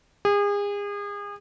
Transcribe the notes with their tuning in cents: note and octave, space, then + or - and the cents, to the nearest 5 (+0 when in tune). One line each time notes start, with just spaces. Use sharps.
G#4 -35